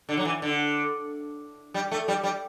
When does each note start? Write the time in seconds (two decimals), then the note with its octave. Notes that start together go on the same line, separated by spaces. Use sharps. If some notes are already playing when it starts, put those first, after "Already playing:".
0.09 D3
0.17 F#3
0.25 E3
0.42 D3
1.74 G3
1.91 A3
2.08 G3
2.23 G3